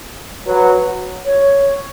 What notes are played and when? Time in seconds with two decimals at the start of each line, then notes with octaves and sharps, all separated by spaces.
0.46 F#3 B4
1.25 C#5